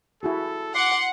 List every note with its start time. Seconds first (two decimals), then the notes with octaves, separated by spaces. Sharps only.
0.23 E4 F#4 G#4 A4
0.75 F#5 C6 D6